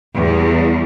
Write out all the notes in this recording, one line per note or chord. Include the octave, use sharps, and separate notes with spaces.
E2 G3